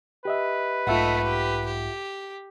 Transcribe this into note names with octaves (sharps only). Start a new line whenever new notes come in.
G4 B4 D#5 E5
B1 G#2 A3 F4 D#5 E5 F#5
G4
G4